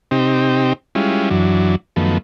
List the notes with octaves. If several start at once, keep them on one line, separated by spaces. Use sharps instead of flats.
C3 C4 D#4 G4
G3 G#3 C#4 E4 F4
F#2 E3 F#3 D4
F#2 D#3 F3 A3 B3